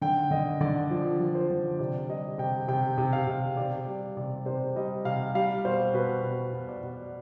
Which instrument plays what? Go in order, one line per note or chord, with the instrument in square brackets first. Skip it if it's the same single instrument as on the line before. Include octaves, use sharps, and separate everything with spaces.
[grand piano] D3 G5
D3 D#5
D3 D5
F3
F3
C5
D3
C3 D5
G3 D#5
C3 G5
C3 G5
C3
F5
C3
C3 D5
G3
C3 D5
C3 C5
G3 D#5
C3 F5
G3 F5
B2 C5
B2 B4
B2
B2
D5
B2